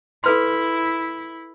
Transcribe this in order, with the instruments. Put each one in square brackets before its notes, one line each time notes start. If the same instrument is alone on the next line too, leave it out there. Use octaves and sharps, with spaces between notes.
[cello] E4 [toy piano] A4 B4 C6